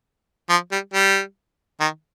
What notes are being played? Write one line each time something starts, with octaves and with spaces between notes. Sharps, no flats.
F3
G3
G3
D#3